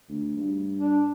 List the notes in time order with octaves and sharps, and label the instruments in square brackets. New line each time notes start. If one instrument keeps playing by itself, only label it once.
[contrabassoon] D2
G2
[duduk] D4